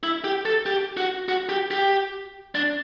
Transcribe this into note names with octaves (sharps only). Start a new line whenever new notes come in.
E4
G4
A4
G4
F#4
F#4
G4
G4
D4